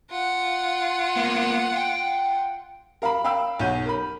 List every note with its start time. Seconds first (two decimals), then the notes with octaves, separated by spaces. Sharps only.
0.11 F4 F#5
1.16 A#3 B3
1.77 G5
3.02 A#4 F5 A#5 B5
3.24 F5 G5 B5 E6
3.59 B1 C#5 F#5 G6 D#7
3.86 A#4 B5